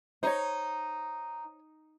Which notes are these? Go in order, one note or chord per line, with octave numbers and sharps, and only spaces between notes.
D#4 C5 C#5